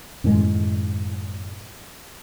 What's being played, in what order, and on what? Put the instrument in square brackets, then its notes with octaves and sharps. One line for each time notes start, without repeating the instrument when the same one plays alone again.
[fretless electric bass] F#2 A2 D#3 G#3